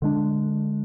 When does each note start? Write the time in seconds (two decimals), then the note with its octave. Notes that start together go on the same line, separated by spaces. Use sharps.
0.02 D3 G#3 D4